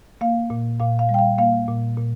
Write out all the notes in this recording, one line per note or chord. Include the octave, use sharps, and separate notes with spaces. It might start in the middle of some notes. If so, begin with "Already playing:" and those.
A#3 F5
A#2
A#2 F5
F5
G3
G5
F5
A#3 F5
A#2
A#2